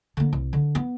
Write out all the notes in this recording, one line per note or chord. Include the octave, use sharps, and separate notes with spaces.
D3 A#3
C2
D3
B3